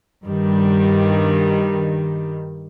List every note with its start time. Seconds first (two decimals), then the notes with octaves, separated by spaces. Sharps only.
0.23 G2 D#3 G3